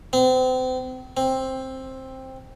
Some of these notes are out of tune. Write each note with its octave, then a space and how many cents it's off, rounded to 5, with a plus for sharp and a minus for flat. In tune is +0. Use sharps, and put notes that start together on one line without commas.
C4 -35
C4 +10